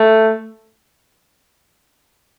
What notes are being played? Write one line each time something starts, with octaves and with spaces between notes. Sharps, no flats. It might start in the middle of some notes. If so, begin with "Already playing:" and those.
Already playing: A3